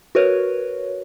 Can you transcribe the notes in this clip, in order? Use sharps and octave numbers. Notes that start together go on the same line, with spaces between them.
F#4 A#4 B4 C#5